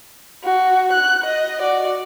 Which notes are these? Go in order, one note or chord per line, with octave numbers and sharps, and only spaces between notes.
F#4
F#6
D#5
F#4 D5